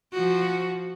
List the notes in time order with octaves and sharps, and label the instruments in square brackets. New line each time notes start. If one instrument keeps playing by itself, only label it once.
[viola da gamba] F3 F#4